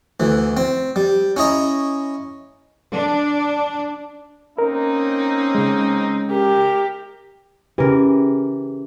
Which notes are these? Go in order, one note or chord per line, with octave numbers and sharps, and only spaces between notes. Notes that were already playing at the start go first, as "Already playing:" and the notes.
D2 E3
C4
G3
C#4 E4 D#5 A#5
D4
A#3 C4 C#4 D#4 A#4
C#3 G#3
G4 A#4
C#3 E3 G4 A#4